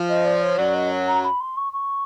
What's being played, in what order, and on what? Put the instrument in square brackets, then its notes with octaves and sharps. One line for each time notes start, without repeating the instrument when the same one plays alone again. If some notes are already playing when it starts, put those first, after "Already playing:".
Already playing: [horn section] F3
[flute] D#5
D5
C#5
[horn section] F#2 F#3 [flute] D5
[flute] D#5
A#5
B5
C6
C#6
C#6